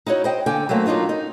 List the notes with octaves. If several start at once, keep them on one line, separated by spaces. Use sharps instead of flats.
D#4 E4 F#4 C#5
C5 D#5 G5
D3 A#3 G5 G#5
F#3 A3 A#3 C4
F#3 D4 D#4 F4 A#4
D#4